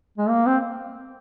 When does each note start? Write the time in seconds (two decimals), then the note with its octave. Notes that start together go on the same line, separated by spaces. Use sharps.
0.18 G#3
0.29 A#3
0.46 C4